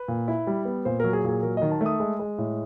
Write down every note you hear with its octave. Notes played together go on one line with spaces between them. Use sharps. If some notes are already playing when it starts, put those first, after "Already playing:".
Already playing: B4
A#2
E4
G3
B3
A#2 C5
F#3 A#4
G#4
A#2 G#4
F#3 A#4
D#3 D#5
A5
A3
D#6
G#3
G#3
A2